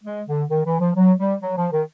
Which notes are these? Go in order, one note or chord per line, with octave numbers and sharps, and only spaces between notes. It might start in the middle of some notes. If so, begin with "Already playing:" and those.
G#3
D3
D#3
E3
F3
F#3
G3
F#3
F3
D#3